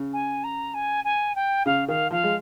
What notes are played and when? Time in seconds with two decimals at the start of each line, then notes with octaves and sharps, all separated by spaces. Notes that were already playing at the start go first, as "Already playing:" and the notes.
Already playing: C#3
0.13 G#5
0.44 A#5
0.74 G#5
1.04 G#5
1.35 G5
1.65 C#3 F5
1.88 D#3 F5
2.11 F3 F5
2.24 G#3